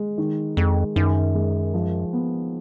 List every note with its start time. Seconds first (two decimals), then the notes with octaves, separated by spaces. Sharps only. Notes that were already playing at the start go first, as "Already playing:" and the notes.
Already playing: G#3
0.18 D#3
0.57 F2 G#3
0.96 F#2 D#3
1.35 G#3
1.74 F3
2.13 B3